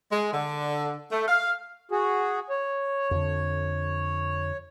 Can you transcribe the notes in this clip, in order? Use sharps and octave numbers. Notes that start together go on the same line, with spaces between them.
G#3
D3
A3
F5
F#4 G#4
C#5
F2 D3